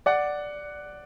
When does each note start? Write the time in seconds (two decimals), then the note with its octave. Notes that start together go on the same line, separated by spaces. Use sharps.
0.06 D5 F#5